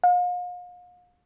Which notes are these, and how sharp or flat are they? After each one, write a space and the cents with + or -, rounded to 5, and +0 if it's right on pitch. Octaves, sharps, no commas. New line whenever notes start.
F5 +40